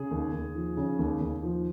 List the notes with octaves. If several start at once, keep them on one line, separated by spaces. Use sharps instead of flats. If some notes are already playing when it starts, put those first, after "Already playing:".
Already playing: C#3 G#4
D#2
D#2
F3
C#3
D#2
D#2
F3